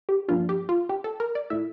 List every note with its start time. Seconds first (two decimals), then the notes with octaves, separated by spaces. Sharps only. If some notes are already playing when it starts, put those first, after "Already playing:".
0.09 G4
0.28 G2 F3 A#3 D4 F4
0.49 G4
0.69 F4
0.89 G4
1.04 A4
1.20 A#4
1.35 D5
1.50 A#2 A3 E4 E5